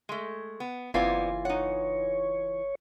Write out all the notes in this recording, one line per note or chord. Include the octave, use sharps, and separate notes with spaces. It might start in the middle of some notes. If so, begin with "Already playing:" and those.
G#3 A3
B3
F#1 E3 B3 C4 F4 D5 G#5
D#4 C#5 F#5